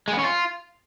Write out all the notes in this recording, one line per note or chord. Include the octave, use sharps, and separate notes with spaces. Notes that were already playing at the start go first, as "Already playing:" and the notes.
G#3
B3
C#4
F4